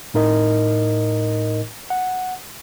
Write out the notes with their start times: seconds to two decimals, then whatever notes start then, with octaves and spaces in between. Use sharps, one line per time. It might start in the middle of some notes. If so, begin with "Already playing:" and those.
0.14 A2 D#4 A#4 D#5
1.90 F#5